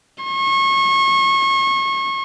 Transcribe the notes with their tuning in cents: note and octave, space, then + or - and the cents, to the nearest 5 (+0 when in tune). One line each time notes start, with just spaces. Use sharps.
C#6 -30